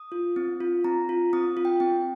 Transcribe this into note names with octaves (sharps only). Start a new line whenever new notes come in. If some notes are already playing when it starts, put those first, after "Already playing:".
Already playing: D#6
F4
C4
F4
C4 A#5
F4
C4 D#6
F4
G5
C4 G5